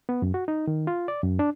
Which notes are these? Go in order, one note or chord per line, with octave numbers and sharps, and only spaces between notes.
B3
F#2
F#4
D#4
D#3
F4
D5
F#2
D4